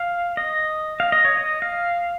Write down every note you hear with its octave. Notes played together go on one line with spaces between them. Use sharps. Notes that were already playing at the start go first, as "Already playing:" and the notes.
Already playing: F5
D#5
F5
D#5
C#5
D#5
F5